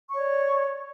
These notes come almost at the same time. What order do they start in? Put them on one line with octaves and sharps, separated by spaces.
C#6 C#5 D5